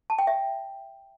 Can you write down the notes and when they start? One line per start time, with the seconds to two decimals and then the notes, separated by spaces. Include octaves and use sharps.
0.10 A5
0.19 G5
0.27 E5